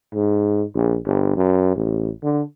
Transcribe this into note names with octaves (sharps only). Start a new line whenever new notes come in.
G#2
A#1
G1
F#2
A1
D3